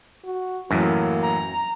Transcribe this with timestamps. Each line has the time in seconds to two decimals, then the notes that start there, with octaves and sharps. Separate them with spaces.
0.24 F#4
0.71 F#2 A2 E3 F#3 A#3
1.23 A#5